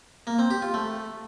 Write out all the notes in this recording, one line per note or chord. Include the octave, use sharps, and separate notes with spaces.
A#3
C4
G4
F4
A3